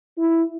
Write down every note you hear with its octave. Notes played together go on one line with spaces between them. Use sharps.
E4